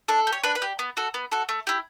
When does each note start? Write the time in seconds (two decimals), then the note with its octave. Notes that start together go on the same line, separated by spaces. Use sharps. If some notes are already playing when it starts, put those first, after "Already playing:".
0.08 D4 A4
0.27 G4
0.33 C#5
0.44 D4 B4
0.55 B4
0.62 G4
0.79 B3
0.97 F#4 A4
1.14 B3
1.32 F#4 A4
1.49 A3
1.67 E4 G4